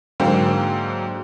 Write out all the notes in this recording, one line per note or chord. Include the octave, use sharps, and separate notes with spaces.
G#2 D3 F#3 A#3 C5 G5